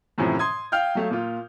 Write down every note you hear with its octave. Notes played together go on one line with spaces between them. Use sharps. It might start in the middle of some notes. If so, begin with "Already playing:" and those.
F#2 A2 C3 E3 F3
C6 D#6 G#6
F5 G5 F6 G6
F#3 A3 F5
A#2 F4